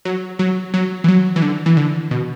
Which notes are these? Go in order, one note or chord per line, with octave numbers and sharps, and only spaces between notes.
F#3
F#3
F#3
E3
F#3
E3
D3
E3
D3
B2